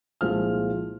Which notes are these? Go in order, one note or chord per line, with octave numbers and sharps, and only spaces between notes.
C2 A#2 F3 G#3 F6